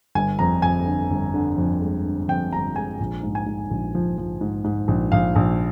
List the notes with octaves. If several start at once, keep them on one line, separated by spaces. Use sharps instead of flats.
G1 G#5
F2 A#5
F2 G#5
D3
G1
D3
F2
G#3
D3
F2 G5
G1 A#5
G#3 G#5
A#1
G#2
G#5
G#2
A#1
F3
F3
G#2
G#2
A#1
A#1 F5
A#1